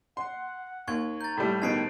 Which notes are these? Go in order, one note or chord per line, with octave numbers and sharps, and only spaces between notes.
F#5 C6
D#2 C#6 G#6
A#5 G6 A6
A2 G3 E4
A1 B2 D#3 C5 A5 C7 D7